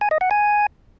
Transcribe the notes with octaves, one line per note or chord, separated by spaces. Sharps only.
G#5
D#5
F#5
G#5